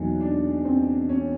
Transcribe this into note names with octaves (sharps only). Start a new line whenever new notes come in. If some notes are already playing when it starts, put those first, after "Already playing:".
Already playing: E2 B2 F#3 A#3 D#4
D4
C4
C#4